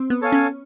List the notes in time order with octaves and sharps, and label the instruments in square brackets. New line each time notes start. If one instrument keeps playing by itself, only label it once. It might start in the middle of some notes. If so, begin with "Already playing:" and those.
Already playing: [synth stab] C4
B3
[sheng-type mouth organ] A4 C#5 F5 G#5
[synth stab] C#4